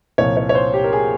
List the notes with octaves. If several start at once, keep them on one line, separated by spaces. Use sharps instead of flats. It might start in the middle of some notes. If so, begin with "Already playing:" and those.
C2 A#2 F3 C#5
C#5
C#5
C5
G4
A#4
G#4